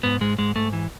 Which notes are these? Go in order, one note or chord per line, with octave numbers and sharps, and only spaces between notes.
G#2 B3
G#2 G#3
G#2 G#3
G#2 A3
E3